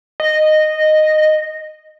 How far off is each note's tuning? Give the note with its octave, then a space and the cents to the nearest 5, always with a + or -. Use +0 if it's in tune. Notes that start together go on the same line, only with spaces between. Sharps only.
D#5 -10